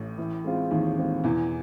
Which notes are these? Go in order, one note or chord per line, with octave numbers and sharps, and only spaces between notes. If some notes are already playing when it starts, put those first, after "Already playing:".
Already playing: A1 A2
E3
G#3 C4 F4
D#2 D#3 E3
G#3 C4 F4
E2 B2 E3